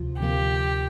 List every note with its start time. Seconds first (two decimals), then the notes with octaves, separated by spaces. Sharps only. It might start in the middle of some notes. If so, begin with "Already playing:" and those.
Already playing: D2 C3 F3 F4
0.20 D2 C3 F3 A#3 F4 G4